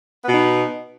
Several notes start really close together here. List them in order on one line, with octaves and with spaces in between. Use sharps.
B3 B2 D#4